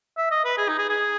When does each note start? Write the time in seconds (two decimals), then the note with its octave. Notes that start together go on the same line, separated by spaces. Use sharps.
0.17 E5
0.31 D#5
0.45 B4
0.58 G#4
0.68 D#4
0.78 G#4
0.89 G#4